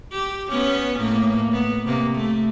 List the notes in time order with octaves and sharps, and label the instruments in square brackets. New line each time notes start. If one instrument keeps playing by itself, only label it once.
[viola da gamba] G4
B3 C#4
A2 A#3
B3
C3 A#3
A3